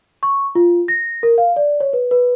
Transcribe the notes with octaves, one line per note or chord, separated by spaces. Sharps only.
C#6
F4
A#6
A#4
F5
D5
C#5
B4
B4